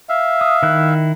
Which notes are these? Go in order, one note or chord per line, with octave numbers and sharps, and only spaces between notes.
E5 F5
D#6
D#3 E4 F#6